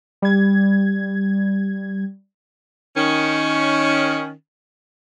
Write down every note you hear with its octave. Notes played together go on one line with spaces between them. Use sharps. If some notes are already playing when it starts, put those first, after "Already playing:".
G3 G#6
D#3 C#4